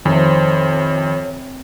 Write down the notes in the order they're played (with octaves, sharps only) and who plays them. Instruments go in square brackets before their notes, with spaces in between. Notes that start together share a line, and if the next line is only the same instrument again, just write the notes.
[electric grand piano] F2 [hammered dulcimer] C3 G#5 [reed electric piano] D#3 [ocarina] C#5